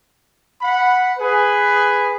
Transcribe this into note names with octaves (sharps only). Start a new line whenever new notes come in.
F#5 B5
G#4 B4